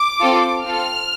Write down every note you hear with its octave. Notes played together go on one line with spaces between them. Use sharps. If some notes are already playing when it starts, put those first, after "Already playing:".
Already playing: D6
C4 F4 A4
C4 F4 A4 F6